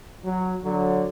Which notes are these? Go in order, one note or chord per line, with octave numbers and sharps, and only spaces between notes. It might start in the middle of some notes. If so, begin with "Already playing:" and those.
F#3
D3 F#3